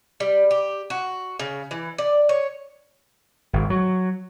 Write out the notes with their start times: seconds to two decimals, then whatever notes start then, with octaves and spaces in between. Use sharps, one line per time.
0.20 G3
0.51 G4
0.90 F#4
1.39 C#3
1.71 E3
1.98 D5
2.29 C#5
3.53 G#1
3.70 F#3